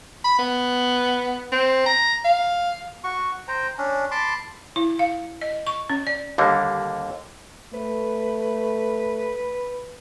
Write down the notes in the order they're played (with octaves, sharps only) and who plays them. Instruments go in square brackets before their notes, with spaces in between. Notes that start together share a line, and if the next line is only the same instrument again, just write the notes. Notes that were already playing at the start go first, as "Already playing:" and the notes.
[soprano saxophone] B5
B3
C4
A#5
F5
[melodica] F#4 C#6
C5 G5 A#5
C#4 D4
A5 B5 C6 D6
[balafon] E4
F5
D#5
C#6
C#4
D5
[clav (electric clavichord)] D#2 D3 G3 A#3
[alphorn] A3 [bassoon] B4